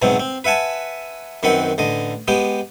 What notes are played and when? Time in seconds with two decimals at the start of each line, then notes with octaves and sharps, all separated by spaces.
0.02 E2 G#2 B2 F#3 C4
0.20 C4
0.44 B4 E5 F#5 G#5 A5
1.43 F#2 D#3 C4 B4 F#5
1.78 A1 D3 D#5
2.28 G#3 B3 G4 G5